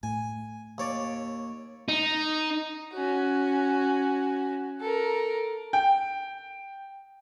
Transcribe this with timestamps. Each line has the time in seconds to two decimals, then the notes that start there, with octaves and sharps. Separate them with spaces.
0.03 A2 G#5
0.78 D#2 C#5 D5
1.88 D#4
2.93 C#4 F#4
4.81 A4 A#4
5.73 G5